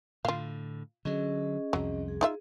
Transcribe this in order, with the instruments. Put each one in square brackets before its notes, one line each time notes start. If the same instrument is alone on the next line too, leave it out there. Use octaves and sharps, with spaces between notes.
[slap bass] A2 D3 [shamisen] F4 F5
[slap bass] D3 F#3 [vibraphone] C#4 G#4 D#5
[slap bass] C2 F2 [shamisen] F#3
[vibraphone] G#4
[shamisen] D#4 F4 E5